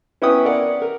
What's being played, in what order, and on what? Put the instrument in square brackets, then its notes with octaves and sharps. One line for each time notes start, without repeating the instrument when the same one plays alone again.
[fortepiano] B3 C#4 E4 B4 G5 D#6
A#4 D5 F#5
A#4